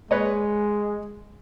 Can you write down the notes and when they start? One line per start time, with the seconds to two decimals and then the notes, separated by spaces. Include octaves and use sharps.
0.11 G#3 B4 C#5 D#5